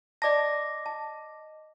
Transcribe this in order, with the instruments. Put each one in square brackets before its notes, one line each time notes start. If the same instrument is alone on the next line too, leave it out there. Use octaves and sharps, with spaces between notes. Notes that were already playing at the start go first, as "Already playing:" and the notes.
[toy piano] D5 A5 [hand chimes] D#5 D6 A#6
[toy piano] A5